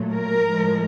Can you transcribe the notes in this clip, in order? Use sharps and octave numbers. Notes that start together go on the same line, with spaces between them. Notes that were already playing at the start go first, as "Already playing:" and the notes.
Already playing: A#2 F#3 A3
A#4
A2 F3 G#3